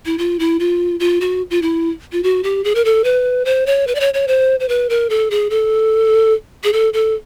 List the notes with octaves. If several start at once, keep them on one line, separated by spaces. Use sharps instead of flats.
E4
F4
E4
F4
F4
F#4
F4
E4
F4
F#4
G4
G#4
A#4
A4
B4
C5
C#5
B4
D5
C#5
C#5
C5
C5
B4
A#4
A4
G#4
A4
G#4
A4
A4